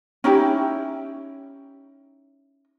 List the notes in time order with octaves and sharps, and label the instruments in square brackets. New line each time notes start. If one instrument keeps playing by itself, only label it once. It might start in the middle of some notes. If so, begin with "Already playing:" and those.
[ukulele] C#4 D#4 E4 G4